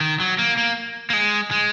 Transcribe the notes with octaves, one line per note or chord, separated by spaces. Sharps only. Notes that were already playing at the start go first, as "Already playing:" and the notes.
D#3
F#3
A#3
A#3
A#3
G#3
G#3